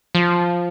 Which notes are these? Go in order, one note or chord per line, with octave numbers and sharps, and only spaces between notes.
F3